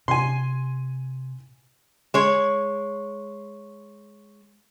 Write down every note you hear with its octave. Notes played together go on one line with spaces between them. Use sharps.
C3 G#5 C6
G#3 C#5